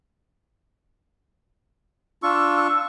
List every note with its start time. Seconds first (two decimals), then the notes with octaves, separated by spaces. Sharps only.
2.23 D4 F4 C#6 E6